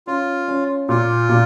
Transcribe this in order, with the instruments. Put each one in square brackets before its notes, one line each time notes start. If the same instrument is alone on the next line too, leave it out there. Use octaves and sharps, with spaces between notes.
[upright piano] C#4 [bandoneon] F4
[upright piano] C#4
[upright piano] A#2 [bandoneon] F4
[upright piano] A#2